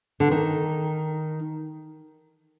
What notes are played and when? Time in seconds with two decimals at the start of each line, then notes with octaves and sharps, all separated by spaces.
0.20 D3
0.31 D#3